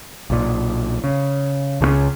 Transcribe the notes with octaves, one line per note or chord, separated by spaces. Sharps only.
B1 A#2
C#3
C#2 C#3 G3 C#4